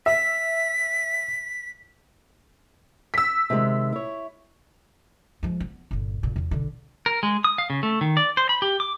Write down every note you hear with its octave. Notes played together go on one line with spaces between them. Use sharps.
E5 B6
E6 B6
C3 D#3 G#3
E4 C#5
F3 G#3
B3
G1 A#2
F1 A#2
E2 D#3
B1 D3
A#4
G#3
D#6
F5
C#3
A3
D#3
D5
C5
B5
G4
D6